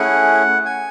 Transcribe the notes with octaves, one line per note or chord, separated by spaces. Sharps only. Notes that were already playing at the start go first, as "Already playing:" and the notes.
Already playing: A3 C#4 E4 G#4 F#5
G#5